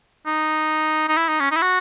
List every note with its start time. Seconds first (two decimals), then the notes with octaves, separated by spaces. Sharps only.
0.27 D#4
1.09 D#4
1.17 E4
1.29 D#4
1.40 C#4
1.52 D#4
1.57 E4
1.62 F#4